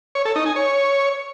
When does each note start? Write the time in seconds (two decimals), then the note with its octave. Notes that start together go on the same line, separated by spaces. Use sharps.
0.15 C#5
0.25 A4
0.36 D#4
0.46 G#5
0.56 C#5